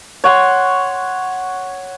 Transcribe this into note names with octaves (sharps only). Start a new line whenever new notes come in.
C#5 F#5 C6